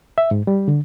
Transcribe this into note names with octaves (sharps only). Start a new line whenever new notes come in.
E5
G#2
G3
D3